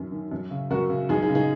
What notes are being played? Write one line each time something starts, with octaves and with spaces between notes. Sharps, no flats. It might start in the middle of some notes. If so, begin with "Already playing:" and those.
Already playing: F#2 D#3 C#4
D#3
F#2
C#3
F#2 F#4 A#4
C#3
F#2 D#4 G#4
D#4 G#4
C#3
D#4 G#4